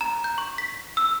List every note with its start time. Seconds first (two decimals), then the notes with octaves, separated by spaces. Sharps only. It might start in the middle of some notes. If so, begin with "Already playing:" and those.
0.01 A#5
0.24 G6
0.38 C#6
0.58 B6
0.97 E6